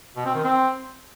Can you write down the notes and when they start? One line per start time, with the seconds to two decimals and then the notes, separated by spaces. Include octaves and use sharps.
0.16 B2
0.26 C4
0.35 D#3
0.44 C4